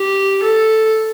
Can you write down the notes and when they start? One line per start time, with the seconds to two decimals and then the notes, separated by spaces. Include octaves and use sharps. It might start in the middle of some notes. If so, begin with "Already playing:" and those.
Already playing: G4
0.44 A4